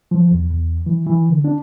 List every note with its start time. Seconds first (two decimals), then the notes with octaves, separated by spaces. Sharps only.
0.11 F3
0.31 E2
0.50 E2
0.86 E3
1.06 E3
1.30 D3
1.44 D4